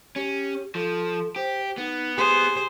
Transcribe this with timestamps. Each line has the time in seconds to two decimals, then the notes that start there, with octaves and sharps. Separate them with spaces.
0.16 C#4 G4
0.75 F3 A4
1.36 G4 C5
1.78 B3 D#4
2.17 G4 G#4 C5